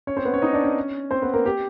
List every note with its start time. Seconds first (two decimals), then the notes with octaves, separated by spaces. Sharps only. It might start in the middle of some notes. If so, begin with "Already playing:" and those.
0.07 C#4 C#5
0.17 C4 C5
0.25 B3 B4
0.34 C#4 C#5
0.42 D#4 D#5
0.53 D4 D5
0.64 C#4 C#5
1.11 C4 C5
1.22 B3 B4
1.34 A#3 A#4
1.46 G4